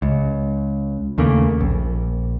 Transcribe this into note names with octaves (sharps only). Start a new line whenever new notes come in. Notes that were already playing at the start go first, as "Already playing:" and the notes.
C#2
D#2 C#3 A3 A#3
A#1